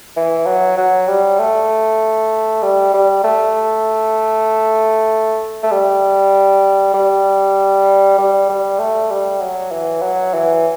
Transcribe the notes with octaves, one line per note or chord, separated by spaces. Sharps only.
E3
F#3
F#3
G3
A3
G3
G3
A3
A3
G3
G3
G3
G3
A3
G3
F#3
E3
F#3
E3